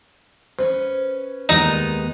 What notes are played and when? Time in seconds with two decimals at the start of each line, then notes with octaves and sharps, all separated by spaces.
0.59 C#4 B4 C5
1.49 D#2 G#3 B3 D#4